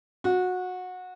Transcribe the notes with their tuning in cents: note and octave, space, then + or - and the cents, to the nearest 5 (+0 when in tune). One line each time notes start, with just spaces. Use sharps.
F#4 -20